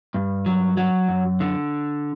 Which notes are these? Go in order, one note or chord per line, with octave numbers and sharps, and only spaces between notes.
G2
F#3
F#3
F#2
D3